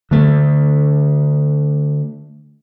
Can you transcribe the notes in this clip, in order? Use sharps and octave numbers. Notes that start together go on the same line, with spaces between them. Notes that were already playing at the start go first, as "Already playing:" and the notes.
D3 A3